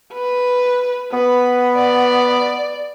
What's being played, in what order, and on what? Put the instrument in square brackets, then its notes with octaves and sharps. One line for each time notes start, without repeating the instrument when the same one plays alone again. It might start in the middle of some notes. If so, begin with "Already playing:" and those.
[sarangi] B4
[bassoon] B3 [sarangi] B4
[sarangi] D5